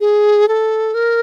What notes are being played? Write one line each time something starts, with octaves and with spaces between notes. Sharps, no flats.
G#4
A4
A#4